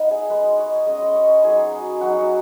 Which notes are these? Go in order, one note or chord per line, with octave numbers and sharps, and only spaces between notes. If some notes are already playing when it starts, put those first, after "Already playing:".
Already playing: B3 D#4
G#4
G#3 D#4 B4
C#5
G#3 C#4 D#5
D#5
C#5
B4
F#3 B3 D#4 G#4
F#3 D#4 F#4